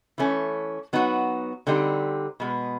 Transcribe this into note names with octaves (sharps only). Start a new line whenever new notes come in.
E3 A3 C#4
F#3 B3 D#4 F#4
D3 G3 C4 D#4 G4
B2 G#3 B3